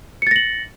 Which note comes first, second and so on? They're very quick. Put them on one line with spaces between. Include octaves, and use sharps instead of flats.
C#7 A6 A#6 F#7